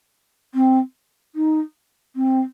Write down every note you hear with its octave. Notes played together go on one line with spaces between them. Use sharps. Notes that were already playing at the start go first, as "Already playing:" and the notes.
C4
D#4
C4